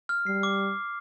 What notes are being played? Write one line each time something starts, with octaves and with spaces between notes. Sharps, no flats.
F6
G3 C7
D6